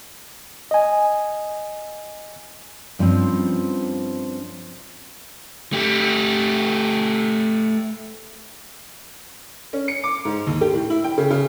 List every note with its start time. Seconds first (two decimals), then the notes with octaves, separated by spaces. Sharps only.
0.71 D#5 G#5
2.99 G2 F3 A#3 C4 C#4
5.73 A3 G4
9.73 C#4
9.88 C#7
10.04 D6
10.25 G#2
10.47 D#2
10.61 G4
10.74 A2
10.90 E4
11.04 G5
11.18 C#3
11.31 C#3